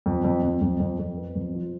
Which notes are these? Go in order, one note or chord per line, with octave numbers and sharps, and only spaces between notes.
F2
F2
F2
F2
F2
F2
B3
F2
F3